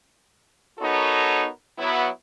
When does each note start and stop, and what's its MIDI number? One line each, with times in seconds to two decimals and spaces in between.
0.79 1.48 59
0.79 1.48 63
0.79 1.48 66
0.79 1.48 69
0.79 1.48 70
0.79 1.48 73
1.78 2.08 54
1.78 2.08 59
1.78 2.08 64